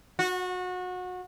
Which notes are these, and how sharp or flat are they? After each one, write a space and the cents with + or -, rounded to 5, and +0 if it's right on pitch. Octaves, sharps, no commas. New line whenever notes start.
F#4 -25